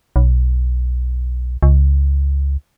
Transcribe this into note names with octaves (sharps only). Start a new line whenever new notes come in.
B1
C#2